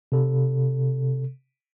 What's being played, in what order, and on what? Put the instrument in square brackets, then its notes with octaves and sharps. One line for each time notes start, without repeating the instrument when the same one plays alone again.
[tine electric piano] C3 A4